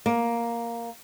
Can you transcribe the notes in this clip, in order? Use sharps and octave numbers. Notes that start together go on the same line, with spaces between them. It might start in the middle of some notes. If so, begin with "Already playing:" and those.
A#3